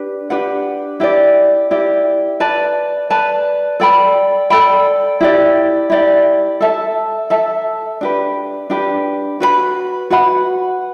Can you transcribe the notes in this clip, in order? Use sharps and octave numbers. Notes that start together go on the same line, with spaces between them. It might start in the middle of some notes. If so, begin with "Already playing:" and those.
Already playing: D4 G4 B4
D4 G4 B4 F#5
E4 G4 D5
E4 G4 D5
B4 D5 A5
B4 D5 A5
A4 D5 G5 B5
A4 D5 G5 B5
E4 G4 D5
E4 G4 D5
A4 E5 A5
A4 E5 A5
D4 G4 B4
D4 G4 B4
F#4 B4 F#5 B5
F#4 B4 F#5 B5